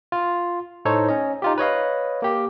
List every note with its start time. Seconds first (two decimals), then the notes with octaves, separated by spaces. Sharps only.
0.12 F4
0.85 A2 D#4 A4 C5 C#5
1.09 C#4 D#5
1.42 D#4 F4 G4
1.58 B4 C#5 D#5 F5
2.22 A#3 G4